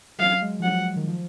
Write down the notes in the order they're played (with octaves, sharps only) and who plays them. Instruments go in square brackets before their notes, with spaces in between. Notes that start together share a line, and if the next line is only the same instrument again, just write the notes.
[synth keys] F#3 [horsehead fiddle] F5
[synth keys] G#3
F3
[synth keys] F#3 [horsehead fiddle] F#5
[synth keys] D#3
F3